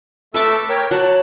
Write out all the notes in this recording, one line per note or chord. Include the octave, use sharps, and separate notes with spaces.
A3 A4 B4 E5 D6 E6
A#4 C#5 G5
F#3 A5 F#6